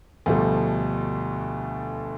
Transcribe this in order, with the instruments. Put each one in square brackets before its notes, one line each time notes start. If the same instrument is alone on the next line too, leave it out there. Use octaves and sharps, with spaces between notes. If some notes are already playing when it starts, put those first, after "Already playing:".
[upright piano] D2 B2 F3 G3 A3